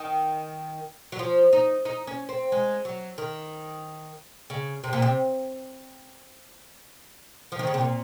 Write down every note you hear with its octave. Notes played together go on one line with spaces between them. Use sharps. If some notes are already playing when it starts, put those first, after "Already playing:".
Already playing: D#3
F#3
F3
D#4
D#4
C#4
C4
G#3
F#3
D#3
C#3
C3
A#2
C3
F3
D#3
C#3
C3
A#2